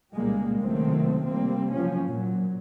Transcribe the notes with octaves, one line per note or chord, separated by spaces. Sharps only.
C#2 A#2 G3 G#3 A#3
C#2 C3 D#3 F#3 A3 C4
F1 G3 A#3 C4
F#1 F#2 F3 C#4
A#2 F#3